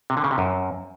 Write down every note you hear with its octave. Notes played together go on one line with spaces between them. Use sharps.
C3
D3
C#3
C3
F#2